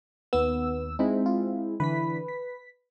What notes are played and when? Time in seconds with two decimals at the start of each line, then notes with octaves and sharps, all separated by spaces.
0.33 D#2 B3 E6
0.99 G#3 C4 D#4 E4
1.26 F4
1.80 D3 E3 B4 B6
2.28 B6